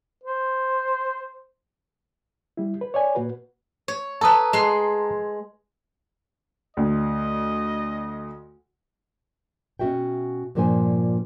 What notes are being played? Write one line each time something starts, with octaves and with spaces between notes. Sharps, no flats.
C5
G3 E4
B4
C#5 D5 G#5
A#2 F#4 B4
C#5
A4 B4 A5 A#5 D#6
G#3 C6
D2 D#5
B2 C#4 F#4 E5 G5
G2 A#2 F3 A#3 C5 G#5